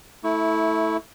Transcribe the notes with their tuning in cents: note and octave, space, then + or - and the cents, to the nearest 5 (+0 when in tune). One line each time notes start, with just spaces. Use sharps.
A3 +0 E4 -15 C#6 +30